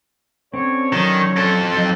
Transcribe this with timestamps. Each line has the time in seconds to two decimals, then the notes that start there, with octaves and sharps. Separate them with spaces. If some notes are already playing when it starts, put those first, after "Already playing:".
0.54 D3 C4 C#4 C#5
0.93 D#3 F#3
1.37 F2 A4
1.75 F#3 D#4 G5